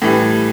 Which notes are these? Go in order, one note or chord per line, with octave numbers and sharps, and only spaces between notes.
A2 E3 G3